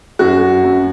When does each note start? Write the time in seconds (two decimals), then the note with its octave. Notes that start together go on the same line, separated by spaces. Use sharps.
0.19 F#2 F#4
0.64 F#2